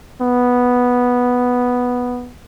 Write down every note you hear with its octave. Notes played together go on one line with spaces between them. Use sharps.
B3